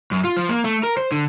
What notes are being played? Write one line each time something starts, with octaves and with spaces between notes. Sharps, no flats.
F#2
F4
F3
A#3
A3
A#4
C5
D3